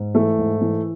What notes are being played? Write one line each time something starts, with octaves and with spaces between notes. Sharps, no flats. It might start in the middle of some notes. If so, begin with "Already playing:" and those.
Already playing: G#2
E3 A3
G#2
E3